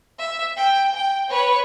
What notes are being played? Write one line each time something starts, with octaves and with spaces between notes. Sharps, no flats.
E5
G5
G5
B4 C#5